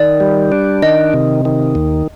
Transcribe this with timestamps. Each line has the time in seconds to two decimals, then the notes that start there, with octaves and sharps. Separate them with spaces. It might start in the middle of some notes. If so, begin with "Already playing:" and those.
Already playing: D#3 D5
0.20 G3
0.52 D4
0.82 D#3 D#5
1.14 C3
1.45 D#3
1.75 D#2